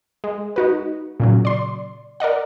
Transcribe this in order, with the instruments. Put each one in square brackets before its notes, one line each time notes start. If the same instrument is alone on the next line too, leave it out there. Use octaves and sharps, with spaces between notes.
[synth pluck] G#3
D#4 F#4 B4
A#2 C#3 F#3
D5 C6
A#4 D5 D#5 F#5